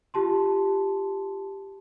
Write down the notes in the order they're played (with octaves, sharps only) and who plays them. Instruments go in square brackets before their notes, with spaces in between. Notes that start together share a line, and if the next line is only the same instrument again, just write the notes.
[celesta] F4 G4 A5 C6